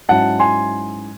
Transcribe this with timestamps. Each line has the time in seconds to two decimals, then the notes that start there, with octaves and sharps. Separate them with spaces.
0.09 G#2 F#3 C#4 E4 F#5 A5
0.40 G#5 C6